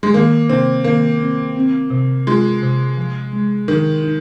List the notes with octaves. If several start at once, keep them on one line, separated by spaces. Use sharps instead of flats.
G#3
D#3 A#3
C3 C4
D#3 A#3
C4
C4
C3
G#3 F4
C3
F3
G#3
D#3 F3
D#4